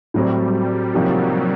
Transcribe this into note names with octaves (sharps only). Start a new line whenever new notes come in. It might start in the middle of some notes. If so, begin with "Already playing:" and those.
A2 F#3 G3 A3 C4
C3 F3 F#3 A#3 D#4 G4